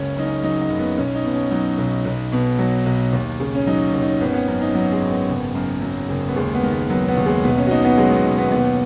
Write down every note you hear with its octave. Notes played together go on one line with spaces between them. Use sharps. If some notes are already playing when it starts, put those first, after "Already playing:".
Already playing: F#1 C#2 C#4
F#2 D#4
C#4
F#3 D#4
D#4
F#1
B3
B1 C#4
D#4
B2
C#4
F#3 D#4
B1
B1
B2
F#3
B1
D#2
C#3
C#4
F#3 D#4
D#2
D#4
G#1 B3
C#4
B3
F#2 B3
D#4
F#3 B3
G#3
G#1
B3
F#1
F#2
F#3
F#1
B3
D#2 G#3
B3
D#3
B3
F#3 B3
B3
D#2
G#3
B1 B3
C#4
F#4
B2 D#4
B3
F#3 G#3
B3
B1
B3
D#2 B3